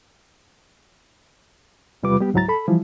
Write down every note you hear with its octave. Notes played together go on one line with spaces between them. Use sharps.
E2 C3 G3 F4 B4 D6
G3 B3 G4
C#2 G#2 F#3 E4 A#5 A6
A4 B5
E3 F3 G3 E4